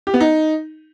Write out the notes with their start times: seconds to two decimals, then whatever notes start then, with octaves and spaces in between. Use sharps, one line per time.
0.07 G4
0.14 B3
0.20 D#4